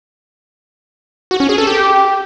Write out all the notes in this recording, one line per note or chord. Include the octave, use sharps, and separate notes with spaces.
F#4
C#4
G#4
A4
G4